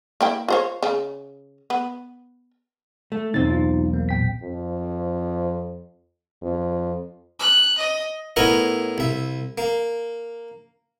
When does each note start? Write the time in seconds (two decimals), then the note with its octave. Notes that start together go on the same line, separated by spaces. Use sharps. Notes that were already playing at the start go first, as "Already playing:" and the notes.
0.21 A#3 E4 G5
0.48 F4 C5 C#5
0.83 C#3
1.70 B3
3.12 A3
3.34 B1 E2 C4 D#4 A6
3.50 D#4 F4
3.94 A#3
4.09 A#2 G5 B6
4.43 F2
6.42 F2
7.39 F#6
7.78 D#5
8.36 A2 B3 E4 A#4 C#5 D#5
8.98 C2 E5
9.58 A#3